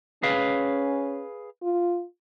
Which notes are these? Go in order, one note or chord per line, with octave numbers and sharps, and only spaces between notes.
C#4 G#4 B4 F5
F4